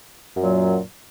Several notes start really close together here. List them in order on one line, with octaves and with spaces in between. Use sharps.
F#2 F#3 A#2